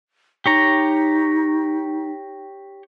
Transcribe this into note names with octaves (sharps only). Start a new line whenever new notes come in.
D#4 G4 C#5 A#5